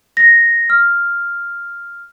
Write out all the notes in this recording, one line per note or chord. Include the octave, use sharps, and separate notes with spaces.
A#6
F6